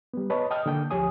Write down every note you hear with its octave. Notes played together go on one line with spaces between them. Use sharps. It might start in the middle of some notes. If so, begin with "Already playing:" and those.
G3 B3
B4 C#5 D#5 A5
D#5 G5 A5 D#6 F6
D3 A#3 G5 G6
D2 F3 G4 C#5 G#5 D#6